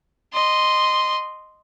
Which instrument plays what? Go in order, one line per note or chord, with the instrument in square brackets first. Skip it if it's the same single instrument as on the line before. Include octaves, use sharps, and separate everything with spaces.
[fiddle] D#5 C6